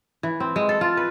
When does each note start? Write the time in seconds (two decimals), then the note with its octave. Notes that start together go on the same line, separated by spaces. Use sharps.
0.23 E3
0.40 C4
0.56 G#3
0.69 A4
0.81 F4
0.97 B4